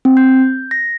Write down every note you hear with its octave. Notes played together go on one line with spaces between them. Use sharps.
C4
G6
A#6